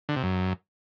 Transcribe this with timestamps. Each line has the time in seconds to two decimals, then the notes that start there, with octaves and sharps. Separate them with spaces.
0.09 D3
0.16 C3
0.23 F#2